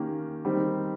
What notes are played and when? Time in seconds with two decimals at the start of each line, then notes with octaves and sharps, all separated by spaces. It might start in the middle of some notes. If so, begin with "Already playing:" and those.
Already playing: D#3 A#3 C#4 G4
0.45 D#3 G3 C4 D#4